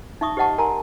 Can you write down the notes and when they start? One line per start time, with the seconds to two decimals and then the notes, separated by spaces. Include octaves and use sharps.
0.21 D#4 E5 C#6 D#6
0.37 G4 C5 D#5 F#5 A5 C#6
0.58 A#4 G#5 A#5 C6